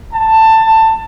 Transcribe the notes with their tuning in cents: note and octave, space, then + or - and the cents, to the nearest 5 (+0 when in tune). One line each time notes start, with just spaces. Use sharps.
A5 +15